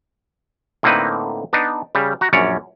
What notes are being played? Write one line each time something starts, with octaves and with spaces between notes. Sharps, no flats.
A2 D3 A#3 C4 D#4 B4
B3 D4 D#4
C#3 G3
F#4 A#5
A#1 F#2 C#4 C#5 D5